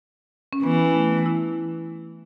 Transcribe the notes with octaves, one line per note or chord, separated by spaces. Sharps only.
C#4
E3 B3
A3
E4